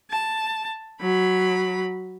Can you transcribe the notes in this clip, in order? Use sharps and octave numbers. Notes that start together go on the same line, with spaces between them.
A5
F#3 B5